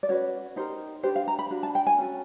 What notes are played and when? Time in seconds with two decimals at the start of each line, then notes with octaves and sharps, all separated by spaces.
0.03 D5
0.09 C#4 F#4 B4 C#5
0.56 D#4 G4 A#4 C5
1.03 D4 G4 B4 C5
1.16 F5
1.28 A#5
1.39 B5
1.51 D4 F#4
1.63 A5
1.75 G5
1.87 G#5
1.98 C#4 F#4 A4